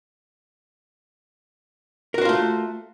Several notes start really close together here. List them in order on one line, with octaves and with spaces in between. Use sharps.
A#4 F#4 C5 F4 A3